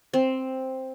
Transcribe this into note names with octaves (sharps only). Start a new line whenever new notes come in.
C4